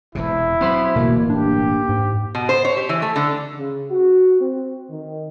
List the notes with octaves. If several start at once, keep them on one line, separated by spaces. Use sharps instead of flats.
E1 E2 C3 E4
F#3 B3 C4 C5 B5
D1 G1 B2 E3 A#3
D4 G4
G#2
B2
C5
C#5
G4
E3
A3
D3
C#3
F#4
C4
D#3